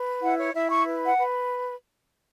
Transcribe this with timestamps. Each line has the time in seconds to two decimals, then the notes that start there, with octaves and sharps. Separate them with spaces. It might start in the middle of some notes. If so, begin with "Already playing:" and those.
Already playing: B4
0.23 E4 F#5
0.38 C#5
0.54 E4 E5
0.70 C#6
0.86 B4
1.06 F#5
1.17 B4